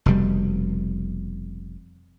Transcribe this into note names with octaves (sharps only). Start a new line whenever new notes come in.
F1 B2 G3